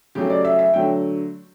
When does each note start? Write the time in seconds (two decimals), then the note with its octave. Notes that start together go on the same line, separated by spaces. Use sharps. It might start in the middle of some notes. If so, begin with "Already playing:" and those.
0.15 C#3 F#3 A3 G4
0.30 D5
0.45 E5
0.59 E5
0.73 D3 F#3 A3 G5